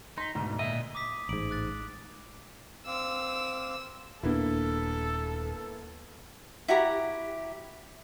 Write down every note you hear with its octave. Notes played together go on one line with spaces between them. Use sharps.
D#4 C6 B6
D2 G#2 B2
A#2 D#5 E5
D6 D#6 B6
A1 G#2 D7 F#7
D6 F#6 A6
C4 F5 D6 E6
D#1 A#3 B3 D4 E4 A4
E4 F#4 G4 A#5